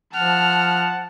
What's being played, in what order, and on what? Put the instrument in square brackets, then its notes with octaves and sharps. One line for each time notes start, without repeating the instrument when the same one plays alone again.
[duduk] F3 [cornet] F#5 [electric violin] A5 [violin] F6